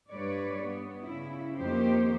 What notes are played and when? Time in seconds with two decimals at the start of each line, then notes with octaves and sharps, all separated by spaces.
0.11 G2 B4 C#5 D5
0.63 B3
1.03 C#3 E4
1.57 F2 D#3 A#3 G4 C5